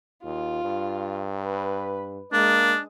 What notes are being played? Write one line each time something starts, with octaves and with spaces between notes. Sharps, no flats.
D#2 F4
G2
B4
G#3 A#3 D4